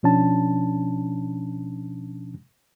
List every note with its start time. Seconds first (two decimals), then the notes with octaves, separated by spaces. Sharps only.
0.03 B2 F3 C#4 D4 A5